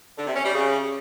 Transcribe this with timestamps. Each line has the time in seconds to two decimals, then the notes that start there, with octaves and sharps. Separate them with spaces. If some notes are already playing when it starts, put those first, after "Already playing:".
0.17 D3
0.26 C3
0.36 C#4
0.45 G3
0.54 C#3